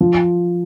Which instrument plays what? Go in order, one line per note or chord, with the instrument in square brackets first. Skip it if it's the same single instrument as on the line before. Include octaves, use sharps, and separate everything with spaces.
[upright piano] F3